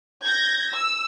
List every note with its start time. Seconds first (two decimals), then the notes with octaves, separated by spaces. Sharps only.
0.23 G6 G#6 A#6
0.72 E6